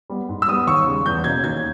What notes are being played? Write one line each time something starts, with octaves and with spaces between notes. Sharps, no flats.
G3 B3
G#2
E6
G3 B3 D#6
D#2 C#6
C#3 G3
E2 G6
B2 A#3 C#4 G#6
D#2 G#6